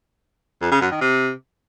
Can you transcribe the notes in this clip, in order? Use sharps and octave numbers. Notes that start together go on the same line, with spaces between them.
F2
C#3
F#2
D#3
C3